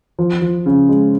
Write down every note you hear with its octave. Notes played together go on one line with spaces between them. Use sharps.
F3
F3
C#3
G#3